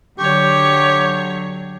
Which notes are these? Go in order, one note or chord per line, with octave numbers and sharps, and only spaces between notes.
D3 F#3 G4 C#5